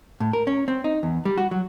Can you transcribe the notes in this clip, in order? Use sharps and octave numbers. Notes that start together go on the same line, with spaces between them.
A2
A#4
C#4
C4
D#4
E2
G3
F#4
F#3